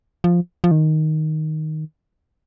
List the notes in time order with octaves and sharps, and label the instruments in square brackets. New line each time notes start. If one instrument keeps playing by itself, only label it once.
[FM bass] F3
F3
D#3